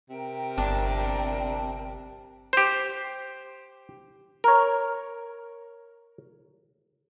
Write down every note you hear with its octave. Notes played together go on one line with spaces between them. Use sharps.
C3 A#4 G5
G1 D4
G4 C5
A#4 C#5